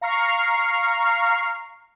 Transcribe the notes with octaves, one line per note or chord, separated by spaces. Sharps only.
F5 A#5 C#6 F6 C7